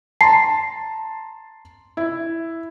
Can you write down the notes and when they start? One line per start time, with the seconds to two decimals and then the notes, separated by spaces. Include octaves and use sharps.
0.21 A5 A#5 C6 C7
1.97 E4